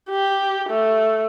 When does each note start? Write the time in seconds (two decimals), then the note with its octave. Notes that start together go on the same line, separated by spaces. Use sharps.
0.10 G4
0.69 A3